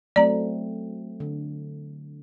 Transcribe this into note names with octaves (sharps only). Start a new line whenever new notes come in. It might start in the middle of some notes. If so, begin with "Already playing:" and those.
F#3 A3 C4 D5 A#5
D3